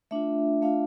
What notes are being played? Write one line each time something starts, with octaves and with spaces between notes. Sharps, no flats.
A3 D4 F4 E5
A3 D4 F4 F5